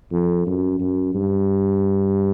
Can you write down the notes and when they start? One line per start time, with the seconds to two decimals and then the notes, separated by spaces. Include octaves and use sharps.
0.12 F2
0.47 F#2
0.80 F#2
1.14 G2